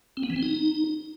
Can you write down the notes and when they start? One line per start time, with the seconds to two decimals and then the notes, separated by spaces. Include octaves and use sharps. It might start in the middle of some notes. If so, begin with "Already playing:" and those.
0.17 C4
0.23 B3
0.30 E3
0.36 C4
0.43 D#4